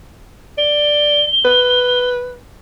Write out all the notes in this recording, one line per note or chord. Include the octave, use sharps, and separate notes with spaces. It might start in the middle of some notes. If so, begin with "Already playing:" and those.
D5 G7
B4